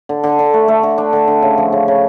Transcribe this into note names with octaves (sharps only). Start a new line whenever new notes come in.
D3
D3
D3
A3
A3
D3
D4
D3
D3
C#3
F3
C#3
C#3